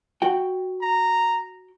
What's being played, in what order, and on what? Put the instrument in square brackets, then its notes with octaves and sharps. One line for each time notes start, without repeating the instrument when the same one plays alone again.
[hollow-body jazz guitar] F#4 G5
[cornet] A#5